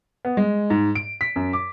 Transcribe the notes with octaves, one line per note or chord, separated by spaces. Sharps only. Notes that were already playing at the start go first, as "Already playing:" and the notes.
B3
G#3
G#2
D7
B6
F#2
D6